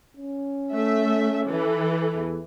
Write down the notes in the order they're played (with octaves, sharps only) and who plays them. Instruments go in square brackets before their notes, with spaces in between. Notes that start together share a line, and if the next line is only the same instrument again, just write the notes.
[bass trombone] C#4
[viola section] A3 E5
E3 A4
[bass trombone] E2